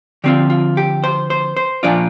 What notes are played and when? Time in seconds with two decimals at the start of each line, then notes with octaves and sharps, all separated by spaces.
0.24 D3 F3 C4 F4 G4
0.50 F4
0.77 G4
1.04 C5
1.30 C5
1.57 C5
1.83 A#2 F3 D4 F4 D5